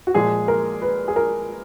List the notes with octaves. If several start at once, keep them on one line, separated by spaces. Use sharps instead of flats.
F#4
A#2 F3 G#3 G#4
A#4
B4
G#4
A#4